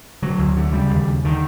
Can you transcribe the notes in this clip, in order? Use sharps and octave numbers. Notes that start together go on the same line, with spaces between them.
D3 F#3
D2
D3
C#3 G3
D#2
C#3
D3 D#3